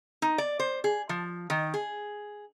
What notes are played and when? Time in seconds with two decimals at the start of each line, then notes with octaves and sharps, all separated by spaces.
0.22 D#4
0.38 D5
0.60 C5
0.84 G#4
1.09 F3
1.50 D#3
1.74 G#4